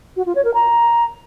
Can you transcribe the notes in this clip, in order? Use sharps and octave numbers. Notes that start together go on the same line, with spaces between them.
F#4
F4
C#5
A#4
A#5